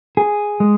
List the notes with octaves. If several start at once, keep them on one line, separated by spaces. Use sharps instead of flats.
G#4
G#3